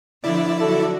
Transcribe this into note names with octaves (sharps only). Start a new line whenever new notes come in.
D3 F3 D4 E4 D5
D3 F#3 F#4 A4